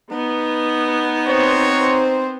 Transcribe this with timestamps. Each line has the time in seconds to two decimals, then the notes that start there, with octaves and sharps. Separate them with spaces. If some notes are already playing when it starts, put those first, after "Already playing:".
0.11 B3 D#4
1.26 C4 F#4 C5 C#5